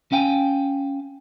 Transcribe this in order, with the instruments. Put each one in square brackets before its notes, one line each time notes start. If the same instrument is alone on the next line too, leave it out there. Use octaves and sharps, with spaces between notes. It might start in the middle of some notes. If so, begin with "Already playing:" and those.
[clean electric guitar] C#4 F5 G5 G#5